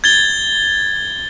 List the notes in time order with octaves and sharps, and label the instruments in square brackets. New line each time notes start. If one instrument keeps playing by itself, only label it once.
[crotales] G#6 A6 G7